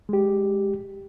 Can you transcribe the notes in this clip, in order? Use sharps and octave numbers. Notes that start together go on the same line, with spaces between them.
G#3 G4